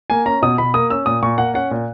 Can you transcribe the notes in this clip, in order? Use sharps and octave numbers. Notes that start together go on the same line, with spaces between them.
A#3 G#5
C#4 A#5
B2 D#6
B2 B5
A#3 D#6
C#4 E6
A#2 D#6
A#2 C#6
A#3 F#5
C#4 F#5
A#2